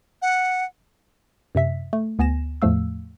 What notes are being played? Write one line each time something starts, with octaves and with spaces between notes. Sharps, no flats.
F#5
F#2 C3 E5 B6
A3
D2 B3 G#5 A#6 E7
E2 A2 F3 A3 F5 E6